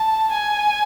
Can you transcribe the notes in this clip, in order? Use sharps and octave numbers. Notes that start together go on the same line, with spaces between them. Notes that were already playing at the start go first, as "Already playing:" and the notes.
Already playing: A5
G#5